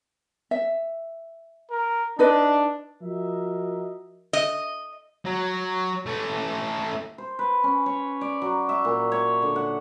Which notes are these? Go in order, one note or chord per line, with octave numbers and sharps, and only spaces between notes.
E5
A#4
D4 D#4 B4 D#5
F3 F#4 A#4 D#5 E5
D#5
F#3
A3 C#4
C5
B4
C#4
C#5
D5
F#3
E5
A#2
C#5
D3
F#5